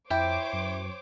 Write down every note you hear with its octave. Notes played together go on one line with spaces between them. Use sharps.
F2 E4 C5 C#5 G5 D6
F#2